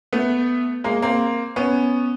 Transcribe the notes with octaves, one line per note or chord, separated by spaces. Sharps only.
A3 B3
G#3 A#3
A#3 C4
B3 C#4